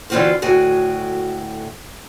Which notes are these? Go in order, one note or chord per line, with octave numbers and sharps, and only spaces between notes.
D3 E3 C4 F4 F#4 C5
D2 A2 F#4 G#5